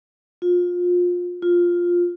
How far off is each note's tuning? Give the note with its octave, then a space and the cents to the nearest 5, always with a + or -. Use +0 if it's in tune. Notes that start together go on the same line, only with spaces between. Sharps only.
F4 +25
F4 +5